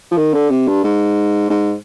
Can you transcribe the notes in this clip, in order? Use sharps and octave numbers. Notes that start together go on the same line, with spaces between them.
F3
D#3
D3
C3
G2
G#2
G#2